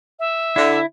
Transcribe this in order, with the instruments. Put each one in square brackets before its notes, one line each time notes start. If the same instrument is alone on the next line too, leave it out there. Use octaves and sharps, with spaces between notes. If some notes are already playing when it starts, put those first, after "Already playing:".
[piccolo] E5
[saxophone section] D3 [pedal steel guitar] E4